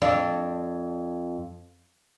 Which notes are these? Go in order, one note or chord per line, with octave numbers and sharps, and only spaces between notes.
F2 D4